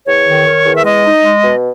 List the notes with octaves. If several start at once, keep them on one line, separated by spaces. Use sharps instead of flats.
E2 C#5
D#3
D#3
E2
E5
G#3 D#5
D#4
G#3
B2